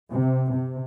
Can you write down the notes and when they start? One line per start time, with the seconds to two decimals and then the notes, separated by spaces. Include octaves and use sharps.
0.10 C3
0.52 C3